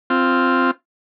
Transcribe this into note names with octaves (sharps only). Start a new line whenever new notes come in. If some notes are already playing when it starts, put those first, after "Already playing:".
C4 F4